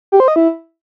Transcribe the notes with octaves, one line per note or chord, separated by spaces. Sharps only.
G4
C5
D#5
E4